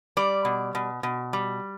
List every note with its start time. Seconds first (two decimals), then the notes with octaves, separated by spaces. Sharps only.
0.17 G3 D5
0.45 B2
0.75 B2
1.03 B2
1.33 G3